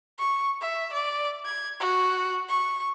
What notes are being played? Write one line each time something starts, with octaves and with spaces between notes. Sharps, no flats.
C#6
E5
D5
G#6
F#4
C#6